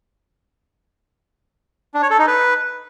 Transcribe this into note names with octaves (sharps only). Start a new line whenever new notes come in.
D4
C#5
A4
D#4
B4